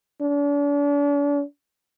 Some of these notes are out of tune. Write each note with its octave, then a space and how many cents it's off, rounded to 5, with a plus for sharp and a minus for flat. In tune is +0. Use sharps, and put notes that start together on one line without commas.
D4 -40